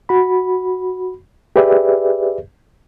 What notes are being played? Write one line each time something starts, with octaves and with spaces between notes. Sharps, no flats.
F#4 B5
G4 G#4 B4 D5 E5